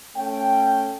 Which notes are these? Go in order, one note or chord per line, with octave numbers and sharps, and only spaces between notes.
A3 C#4 A4 G5